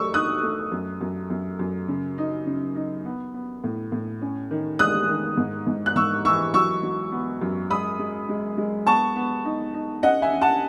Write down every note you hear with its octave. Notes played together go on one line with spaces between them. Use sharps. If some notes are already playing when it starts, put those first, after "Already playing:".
Already playing: F#3 A3 C#6 E6
D#4 D#6 F#6
A3
F#2
F#2
F#2
F#2
C#3
D#4
C#3
D#4
B3
B3
A2
A2
C#4
D#3
G#3 D#6 F#6
D#3
G#2
G#2
F#6
G#2 C#6 E6
E3 C#6 E6
F#3 C#6 E6
F#3
B3
F#2
G#3 B5 D#6
G#3
G#3
G#3
B3 A5 C#6
B3
D#4
D#4
C#4 D#5 F#5
E5 G#5
C#4
F#5 A5